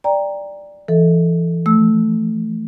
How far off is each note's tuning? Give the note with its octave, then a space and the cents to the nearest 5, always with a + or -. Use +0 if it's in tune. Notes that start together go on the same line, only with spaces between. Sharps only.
D5 +0 G5 +20 A#5 +0
E3 +25 A4 +0 D#5 +35
F3 +0 A3 +0 E6 -15